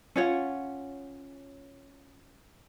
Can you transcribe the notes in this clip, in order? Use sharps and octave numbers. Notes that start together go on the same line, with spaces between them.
C#4 F4 C#5 F#5